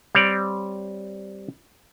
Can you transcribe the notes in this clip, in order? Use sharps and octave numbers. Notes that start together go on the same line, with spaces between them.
G3 C4 C#5 D5